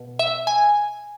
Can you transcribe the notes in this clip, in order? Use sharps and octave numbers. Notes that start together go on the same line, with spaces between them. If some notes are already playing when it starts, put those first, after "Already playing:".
Already playing: B2
E5
G#5